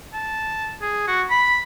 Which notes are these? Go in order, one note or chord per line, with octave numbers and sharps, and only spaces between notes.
A5
G#4
F#4
B5